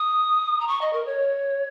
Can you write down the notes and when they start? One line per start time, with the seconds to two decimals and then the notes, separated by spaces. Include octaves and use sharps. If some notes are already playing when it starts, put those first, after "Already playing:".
Already playing: D#6
0.60 A#5
0.68 C#6
0.81 D#5
0.93 A#4
1.06 C#5